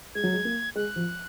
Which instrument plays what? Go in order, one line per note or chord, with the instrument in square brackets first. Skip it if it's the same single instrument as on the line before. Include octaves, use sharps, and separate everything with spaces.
[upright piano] G#3 [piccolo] G#6
[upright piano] F#3
G#3
A#3
[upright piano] G#3 [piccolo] F#6
[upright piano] F3